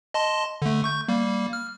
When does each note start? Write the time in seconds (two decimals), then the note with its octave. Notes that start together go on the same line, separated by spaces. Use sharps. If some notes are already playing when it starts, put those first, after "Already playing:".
0.14 D#5 A5 C6
0.62 D3 A3
0.84 C#6 G6
1.08 G3 A#3
1.53 F6